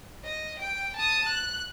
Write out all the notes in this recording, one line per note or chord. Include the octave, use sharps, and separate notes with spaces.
D#5
G5
A5 D#6
F#6